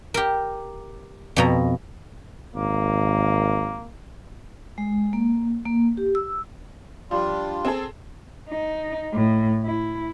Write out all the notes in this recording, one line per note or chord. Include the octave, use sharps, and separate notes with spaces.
G4 A#4
F2 B2 A#5
G#1 A#3
G#3
A#3
A#3
G4
E6
F3 G3 D4 F4
C4 G#4 A4
D#4
A2
E4